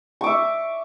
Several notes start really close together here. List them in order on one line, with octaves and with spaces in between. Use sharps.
C#6 D6 E5